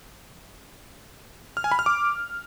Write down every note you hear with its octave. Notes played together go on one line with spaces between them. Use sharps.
F6
G#5
B5
F6
D6